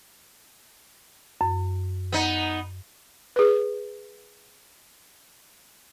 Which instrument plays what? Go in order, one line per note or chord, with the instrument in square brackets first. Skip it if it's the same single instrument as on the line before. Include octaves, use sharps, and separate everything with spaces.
[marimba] F#2
[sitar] B3 D#4
[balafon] G#4 B4